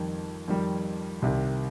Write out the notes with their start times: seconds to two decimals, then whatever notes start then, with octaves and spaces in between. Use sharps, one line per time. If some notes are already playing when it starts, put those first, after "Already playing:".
Already playing: F2 D#3 G3
0.48 F2 D#3 G3
1.22 C2 C3 D#3